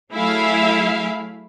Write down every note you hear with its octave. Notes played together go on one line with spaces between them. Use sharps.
F#3 A3 E4 G#4 E5 F5